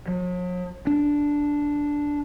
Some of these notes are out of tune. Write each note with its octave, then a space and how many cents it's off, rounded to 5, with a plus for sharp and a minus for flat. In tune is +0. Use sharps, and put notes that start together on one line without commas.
F#3 -45
D4 -5